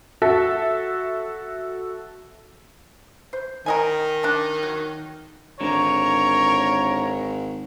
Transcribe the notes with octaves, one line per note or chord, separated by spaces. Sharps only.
F#4 A4 E5
C5
D#3 A#4 D#5 G#5
D4 A5
F#3
G#1 D3 A#4 C#5